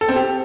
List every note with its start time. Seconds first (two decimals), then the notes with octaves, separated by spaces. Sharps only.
0.01 A4
0.08 C4
0.16 G4